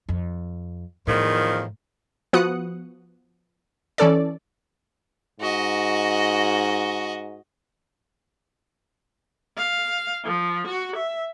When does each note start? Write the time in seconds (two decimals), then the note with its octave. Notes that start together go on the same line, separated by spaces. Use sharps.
0.09 F2
1.07 E2 A2 D#3 F3
2.33 F3 B3 F#4 D#6 F#6 C#7
3.98 E3 C#4 A4 D5
5.40 G#2 F#4 D#5
9.57 F5
10.24 F3
10.67 F#4
10.96 E5